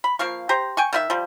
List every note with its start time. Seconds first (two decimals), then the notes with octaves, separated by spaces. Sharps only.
0.04 B5
0.19 F3 A#3 F5 C#6
0.49 G4 C5 A#5
0.77 G5 G#5 C#6
0.93 D#3 F4 E5
1.10 F3 G3